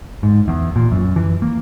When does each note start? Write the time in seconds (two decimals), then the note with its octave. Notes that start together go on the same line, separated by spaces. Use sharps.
0.23 G#2
0.48 E2
0.76 A#2
0.92 F#2
1.16 E3
1.42 A#3